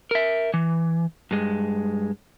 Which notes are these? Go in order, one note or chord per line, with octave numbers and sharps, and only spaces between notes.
A#4 E5
E3
G2 G#3